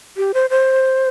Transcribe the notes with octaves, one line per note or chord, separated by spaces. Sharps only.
G4
C5
C5